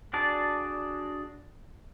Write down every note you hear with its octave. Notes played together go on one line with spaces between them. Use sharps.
D4 F#4 G#4 D5 A5